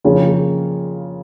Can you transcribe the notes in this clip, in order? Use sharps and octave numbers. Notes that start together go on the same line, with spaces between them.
F2 C#3 F3 A#3